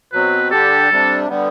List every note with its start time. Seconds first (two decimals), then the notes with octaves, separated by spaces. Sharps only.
0.12 B2 F#3 C4 B4
0.51 D3 G3 D4 G4 A4
0.91 C3 G3 D4
1.29 D3 G3 B3